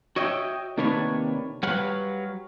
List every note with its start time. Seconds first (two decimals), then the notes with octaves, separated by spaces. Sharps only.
0.16 F#4 C#5 D#5 E5 F#5 G5
0.78 C3 D#3 A#3 D4 B4 C#5
1.63 F#3 G3 B4 C#5 F5 F#5